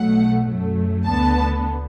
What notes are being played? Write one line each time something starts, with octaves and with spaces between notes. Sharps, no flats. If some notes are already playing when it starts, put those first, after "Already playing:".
Already playing: B1 B2 F#3 A3 F#5
F#2 F#3 A3
D2 D3 B3 A5